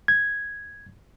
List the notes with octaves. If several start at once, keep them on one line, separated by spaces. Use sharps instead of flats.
G#6